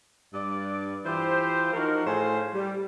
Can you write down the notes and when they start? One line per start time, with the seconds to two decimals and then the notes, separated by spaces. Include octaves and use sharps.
0.34 G2 D5
1.06 E3 F4 G4 C5
1.73 F3 D#4 F#4 A#4
2.06 A2 G#4 C5 F5 G#5
2.54 G3